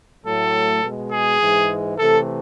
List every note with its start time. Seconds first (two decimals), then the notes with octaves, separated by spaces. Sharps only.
0.25 A2 F#3 A3 A4
0.82 B2 G#3
1.11 G#4
1.40 G#2 E3 G#3
1.98 C3 E3 A3 A4